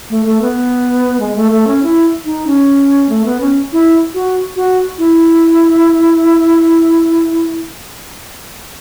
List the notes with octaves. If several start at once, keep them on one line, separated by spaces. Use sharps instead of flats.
A3
A3
B3
G#3
A3
A3
C#4
E4
D#4
C#4
A3
B3
C#4
E4
F#4
F#4
E4